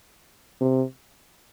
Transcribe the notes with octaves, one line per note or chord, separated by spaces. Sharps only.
C3